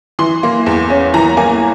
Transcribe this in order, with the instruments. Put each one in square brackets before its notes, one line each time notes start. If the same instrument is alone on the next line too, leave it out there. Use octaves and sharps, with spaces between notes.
[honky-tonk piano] E3 C6
A#3
E2
C#4
E3 A#5
A#3 G#5